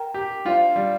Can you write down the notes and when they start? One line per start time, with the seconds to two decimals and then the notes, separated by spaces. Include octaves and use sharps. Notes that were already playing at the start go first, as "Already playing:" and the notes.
Already playing: A#4 G5 A#5
0.14 G4
0.45 D4 F4 G4 C5 F5
0.76 G3